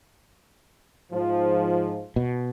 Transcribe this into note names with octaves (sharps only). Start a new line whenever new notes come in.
G#2 F3
B2